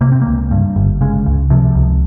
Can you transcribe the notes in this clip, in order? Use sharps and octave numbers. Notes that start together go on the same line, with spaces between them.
C3 A#3
C4
C#2 A#3
G2
G1
C#3 G#3
C#2
C3 F3
C#2